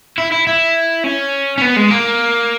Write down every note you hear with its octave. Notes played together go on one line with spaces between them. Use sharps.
E4
E4
E4
C#4
C#4
B3
G#3
A#3